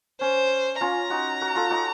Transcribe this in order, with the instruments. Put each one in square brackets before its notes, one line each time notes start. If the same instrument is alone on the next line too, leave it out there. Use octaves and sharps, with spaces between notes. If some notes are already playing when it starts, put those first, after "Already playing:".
[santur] C#4 [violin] C5
[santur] C#4 F4 [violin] A#5
[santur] D#4 F#4
F#4 A#4
F4 A4
D#4 F#4